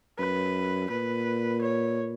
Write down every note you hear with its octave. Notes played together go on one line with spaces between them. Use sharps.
F#2 B4
A#2 B4
C#5